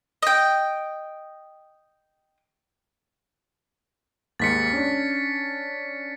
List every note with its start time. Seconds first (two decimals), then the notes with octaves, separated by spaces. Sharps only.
0.23 D#5 G5
4.40 D#2 G#2 A6 B6 C#7
4.73 C#4 D4